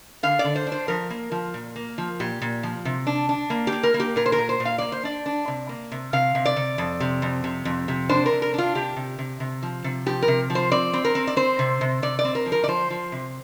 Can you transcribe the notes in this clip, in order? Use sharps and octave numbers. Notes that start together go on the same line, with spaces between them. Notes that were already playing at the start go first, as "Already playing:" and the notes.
D3 F5
D5
D3
C5
D4
C5
F3 A#4
A#3
F3
A#2
A#3
F3
A#2 G4
A#2
F3
C3
D4
D4
A#3
G4
A#3
A#4
A#3
G4
A#2 A#4
C5
A#4
A#2
C5
A#2
F5
A#3 D5
C5
D4 D5
D4
C3
A#3
C3
C3 F5
C3
D5
C3
F2
C3
F2
C3
F2
C3
D4 C5
A#4
C3
A#4
D4 F4
C3 G4
C3
C3
C3
F3
C3
F3 G4
A#4
C3
F3
C5
C4 D5
C4
A#4
C4
D5
C4 C5
C3
C3
C3 D5
D5
C4
A#4
F3
A#4
D5
F3 C5
F3
C3